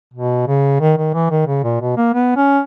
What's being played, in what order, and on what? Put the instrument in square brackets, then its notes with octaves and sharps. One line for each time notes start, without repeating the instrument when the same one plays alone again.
[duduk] B2
C#3
D#3
D#3
E3
D#3
C#3
A#2
B2
A#3
B3
C#4